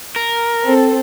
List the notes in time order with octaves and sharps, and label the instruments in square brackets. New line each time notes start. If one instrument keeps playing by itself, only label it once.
[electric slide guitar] A#4
[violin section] C4 A4